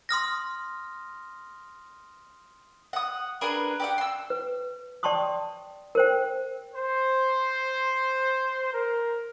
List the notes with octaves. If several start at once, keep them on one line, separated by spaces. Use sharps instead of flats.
C6 D#6 F6 A#6
F#5 D#6
D4 G#4 A#4 B4
G4 D5 F#5
C6 E6
B4
D5 G5 A5 C6 C#6 D#6
A#4 C5 G5
C5
A#4